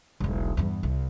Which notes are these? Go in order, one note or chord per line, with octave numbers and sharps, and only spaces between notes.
E1 B1
E2 G2
C2